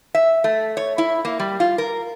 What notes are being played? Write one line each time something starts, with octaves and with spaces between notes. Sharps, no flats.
E5
A3
C#5
E4
A#3
G3
F4
A#4